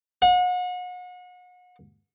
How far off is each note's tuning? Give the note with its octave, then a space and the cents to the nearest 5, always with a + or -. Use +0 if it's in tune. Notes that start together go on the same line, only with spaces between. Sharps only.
F#5 -35